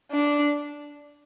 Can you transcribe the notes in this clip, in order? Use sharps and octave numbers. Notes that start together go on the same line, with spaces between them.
D4